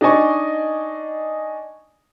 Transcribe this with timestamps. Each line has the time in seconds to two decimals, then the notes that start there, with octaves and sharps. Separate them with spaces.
0.01 D4 D#4 D5 D#5 G#5 C#6